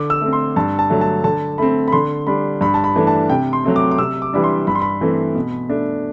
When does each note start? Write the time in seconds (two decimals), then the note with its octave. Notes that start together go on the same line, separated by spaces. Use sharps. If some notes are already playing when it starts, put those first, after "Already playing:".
Already playing: D3 D6
0.10 E6
0.21 A3 C4
0.33 C6
0.56 G2 A5
0.79 A5
0.90 D3 F#3 A3
1.01 A5
1.24 D3 A5
1.58 A3 C4 B5
1.88 B5
1.92 D3 C6
2.27 G3 D4 B5
2.61 G2 B5
2.74 A5
2.84 B5
2.96 E3 A3 D4
3.07 A5
3.30 C3 G5
3.53 C6
3.64 F#3 A3 C4
3.76 D6
3.91 D6
3.98 C3 E6
4.22 D6
4.33 E3 G3 D4 B5
4.44 C6
4.67 G2 B5
4.75 C6
4.82 B5
5.01 E3 A3 C4
5.35 B2
5.69 A3 D4